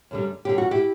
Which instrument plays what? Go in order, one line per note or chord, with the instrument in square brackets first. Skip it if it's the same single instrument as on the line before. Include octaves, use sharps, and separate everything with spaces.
[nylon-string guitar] F#2 D3 G3
F#2 D3 G3 G4
F#4
E4 G4